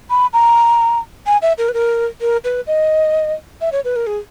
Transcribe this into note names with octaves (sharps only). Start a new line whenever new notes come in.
B5
A#5
G#5
E5
A#4
B4
A#4
A#4
B4
D#5
E5
C#5
B4
A#4
G#4